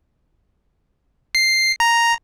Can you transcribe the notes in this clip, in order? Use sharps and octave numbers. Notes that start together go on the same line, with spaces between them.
C7
A#5